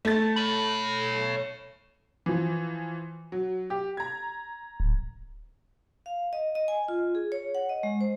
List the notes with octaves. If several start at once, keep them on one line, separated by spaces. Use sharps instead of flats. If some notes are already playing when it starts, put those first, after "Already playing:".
A3 A6
C#5 B5
E3 F3
F#3
G4
A#5 G#6
D1
F5
D#5
D#5
G#5
F4
G#4
C#5
F#5
D#5
G#3
C5